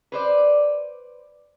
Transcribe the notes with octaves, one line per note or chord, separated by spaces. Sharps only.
B4 C5 D5